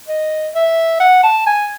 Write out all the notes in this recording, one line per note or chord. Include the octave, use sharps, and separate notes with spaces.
D#5
E5
F#5
A5
G#5